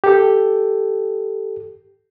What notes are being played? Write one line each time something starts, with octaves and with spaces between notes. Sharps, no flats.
G4 A4